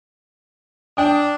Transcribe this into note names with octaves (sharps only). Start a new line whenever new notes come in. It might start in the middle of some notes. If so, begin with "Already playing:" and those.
D4 G5 D#6